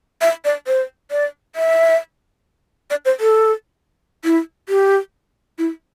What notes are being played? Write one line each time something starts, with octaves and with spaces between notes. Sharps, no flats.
E5
D5
C5
D5
E5
D5
C5
A4
E4
G4
E4